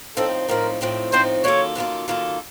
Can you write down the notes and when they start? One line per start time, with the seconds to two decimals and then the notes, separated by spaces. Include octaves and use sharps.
0.17 A2 F3 C4 D#4 A4
0.48 A2 F3 C4 D#4 A#4
0.81 A2 F3 C4 D#4
1.12 A2 F3 C4 D#4 C5
1.44 F#2 D#3 A#3 F4 A4 C#5
1.75 F#2 D#3 A#3 F4 A4
2.08 F#2 D#3 A#3 F4 A4